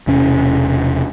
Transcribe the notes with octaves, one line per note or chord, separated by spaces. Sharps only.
E1 C3 C#4